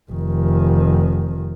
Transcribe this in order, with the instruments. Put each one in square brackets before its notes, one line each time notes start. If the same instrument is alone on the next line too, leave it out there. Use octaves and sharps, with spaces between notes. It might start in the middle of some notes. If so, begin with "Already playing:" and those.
[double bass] F1 D#3